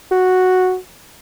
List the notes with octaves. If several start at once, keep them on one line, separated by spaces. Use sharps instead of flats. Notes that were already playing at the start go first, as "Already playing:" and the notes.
F#4